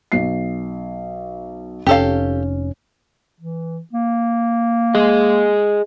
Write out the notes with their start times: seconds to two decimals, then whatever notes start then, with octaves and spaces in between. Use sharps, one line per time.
0.12 B1 C7
1.87 F1 C#4 G4 A4 F5
3.41 E3
3.93 A#3
4.95 G#4 D#5